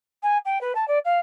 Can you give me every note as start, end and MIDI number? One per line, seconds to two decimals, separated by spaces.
0.22 0.37 80
0.45 0.60 79
0.61 0.72 71
0.75 0.87 81
0.87 0.98 74
1.04 1.19 77